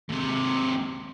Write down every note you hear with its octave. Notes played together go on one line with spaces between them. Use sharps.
D#2 C3